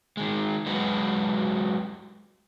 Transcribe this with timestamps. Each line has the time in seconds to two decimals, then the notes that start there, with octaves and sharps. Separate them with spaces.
0.17 D#3 G#3
0.66 F#3 G#3 F#4 B4